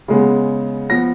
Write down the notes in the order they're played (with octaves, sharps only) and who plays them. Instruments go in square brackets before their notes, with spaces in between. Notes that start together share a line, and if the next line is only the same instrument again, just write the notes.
[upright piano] C#3 G#3 B3
F3 B3 A#6